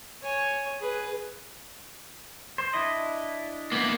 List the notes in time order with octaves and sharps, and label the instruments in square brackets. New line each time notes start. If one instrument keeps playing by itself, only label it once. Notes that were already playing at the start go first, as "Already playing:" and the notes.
[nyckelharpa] C#5 G#5
G#4 B4
[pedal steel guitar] C5
D4 E4 D#5
[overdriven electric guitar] A#3 B3